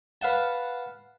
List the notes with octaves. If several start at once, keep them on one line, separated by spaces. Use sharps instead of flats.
B4 F5 F#5 A5